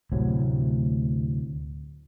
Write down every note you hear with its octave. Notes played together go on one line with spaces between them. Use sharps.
D2 A2 C3 F#3